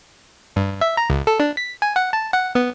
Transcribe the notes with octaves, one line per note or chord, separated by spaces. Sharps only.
G2
E5
A#5
C#2
A4
D4
B6
G#5
F#5
A5
F#5
B3